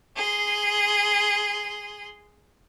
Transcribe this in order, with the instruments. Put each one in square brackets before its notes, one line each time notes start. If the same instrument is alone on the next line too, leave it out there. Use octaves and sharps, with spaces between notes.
[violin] G#4 C6